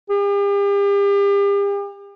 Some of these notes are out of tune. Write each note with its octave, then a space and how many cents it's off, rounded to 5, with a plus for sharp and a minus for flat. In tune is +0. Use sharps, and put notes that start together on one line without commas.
G4 +40